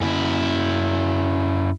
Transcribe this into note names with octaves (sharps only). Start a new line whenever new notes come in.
F#2 E4